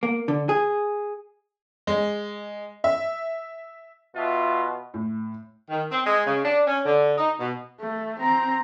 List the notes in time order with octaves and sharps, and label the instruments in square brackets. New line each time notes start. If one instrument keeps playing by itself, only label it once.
[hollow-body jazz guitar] A#3
D3
G#4
[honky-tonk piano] G#3
E5
[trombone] B2 [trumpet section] F4 [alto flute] E5
[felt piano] A2
[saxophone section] D#3
C4
G#3
C#3
D4
C#4
D3
D#4
B2
[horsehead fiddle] A3
C4 A#5